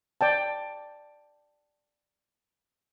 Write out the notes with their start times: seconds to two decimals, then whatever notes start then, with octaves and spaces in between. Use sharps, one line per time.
0.21 D5 G5 A5